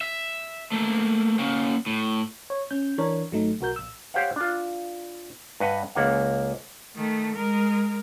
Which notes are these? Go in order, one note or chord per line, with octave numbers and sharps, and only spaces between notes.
E5
A3 A#3
A#3 C#4
A2
C#5
C#4 G6
E3 D4 A#4 C#5
G#1 F#3 A3 D#4
B1 F#4 A#4 G6
A#1 E6
G4 C5 C#5 F5 F#5
D4 F4
G2 B4 D#5 F#5
C#2 A#3 F#5
D#3 A3
G#3 A#4